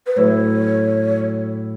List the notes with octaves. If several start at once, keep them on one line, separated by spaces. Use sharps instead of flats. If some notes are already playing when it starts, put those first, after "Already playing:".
B4
A2 F#3 A3 E4 C#5